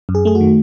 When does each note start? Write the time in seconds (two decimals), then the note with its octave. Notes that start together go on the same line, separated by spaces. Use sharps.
0.09 F#2
0.15 G#4
0.25 A3 G#4
0.35 F#4
0.41 D#3